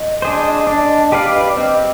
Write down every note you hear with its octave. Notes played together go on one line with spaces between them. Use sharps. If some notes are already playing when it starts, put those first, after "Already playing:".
Already playing: D#5
D4 G#4 C5
D4
G4 B4 D5 F5
D5
C4 D#5